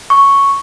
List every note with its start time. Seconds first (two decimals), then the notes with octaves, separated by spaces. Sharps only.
0.10 C#6